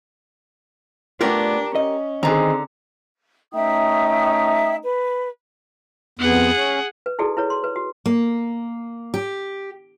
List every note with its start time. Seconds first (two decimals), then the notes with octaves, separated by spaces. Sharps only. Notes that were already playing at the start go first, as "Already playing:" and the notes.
1.21 A3 B3 D4 F4 G4 A#4 D5
1.75 C#4 D#5
2.23 D3 D#3 C4 D#4 G#4 A#5
3.53 A3 C#4 D#4 E5 G5 D#6
4.84 B4
6.19 F2 B3 G#4 F#5
6.55 C#4
7.06 B4
7.19 D#4 E4 F#4 G#4 A4 D5
7.37 E4 B4 C#5
7.50 C6
7.64 B4
7.76 F#4
8.06 A#3
9.14 G4